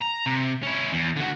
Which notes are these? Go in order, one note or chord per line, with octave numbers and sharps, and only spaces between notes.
A#5
C3
C#4 E4
E2
D3 F#4